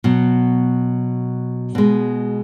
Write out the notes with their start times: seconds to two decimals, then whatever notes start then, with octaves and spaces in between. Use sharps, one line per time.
0.04 B2 F#3
1.75 B2 G#3